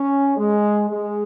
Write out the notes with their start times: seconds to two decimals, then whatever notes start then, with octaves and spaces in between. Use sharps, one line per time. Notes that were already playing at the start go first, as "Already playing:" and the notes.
Already playing: C#4
0.37 G#3
0.90 G#3